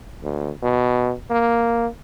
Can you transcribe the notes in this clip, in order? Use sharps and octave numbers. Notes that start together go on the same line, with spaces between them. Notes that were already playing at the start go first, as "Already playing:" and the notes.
D2
B2
A#3